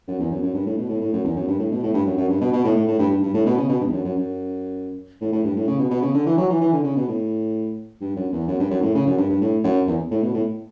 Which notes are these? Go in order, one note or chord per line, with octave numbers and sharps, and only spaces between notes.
F#2
E2
F#2
F#2
G2
A2
B2
A2
A2
F#2
E2
F#2
G2
A2
B2
A2
G2
F#2
F#2
G2
B2
B2
A2
A2
A2
G2
G2
G2
A2
B2
C#3
B2
G2
E2
F#2
F#2
F#2
A2
A2
G2
A2
C#3
B2
B2
C#3
D3
E3
F#3
E3
E3
D3
C#3
B2
A2
G2
F#2
E2
F#2
G2
F#2
A2
C#3
F#2
G2
G2
A2
F#2
E2
A2
B2
A2